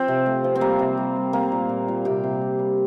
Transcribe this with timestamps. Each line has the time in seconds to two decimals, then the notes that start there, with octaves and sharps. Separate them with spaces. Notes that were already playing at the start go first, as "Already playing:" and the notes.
Already playing: F3 C4
0.08 C3
0.26 A3
0.44 F3
0.55 C4
0.61 G3 A#3
0.79 C3
0.97 G3
1.16 G3
1.33 A3 A#3
1.52 A#2
1.69 A#2
1.88 A#2
2.05 C3 G4
2.24 C3
2.41 G3
2.59 G3